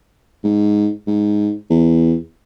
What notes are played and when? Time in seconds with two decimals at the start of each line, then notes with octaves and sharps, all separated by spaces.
0.44 G#2
1.07 G#2
1.70 E2